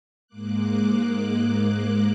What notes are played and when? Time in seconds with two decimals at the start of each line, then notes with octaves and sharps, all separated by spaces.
0.27 G#2 G#3 A#3 D6 F#6